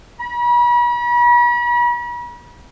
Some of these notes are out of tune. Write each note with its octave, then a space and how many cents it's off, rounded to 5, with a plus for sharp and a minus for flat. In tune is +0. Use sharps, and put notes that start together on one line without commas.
B5 -40